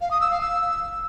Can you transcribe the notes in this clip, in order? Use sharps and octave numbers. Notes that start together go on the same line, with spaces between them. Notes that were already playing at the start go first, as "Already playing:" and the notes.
F5
D#6
E6
F5
E6